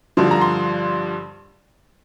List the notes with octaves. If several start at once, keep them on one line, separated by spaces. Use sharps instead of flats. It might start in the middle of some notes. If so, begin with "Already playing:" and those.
G2 D3 F3 C6
A#5
C6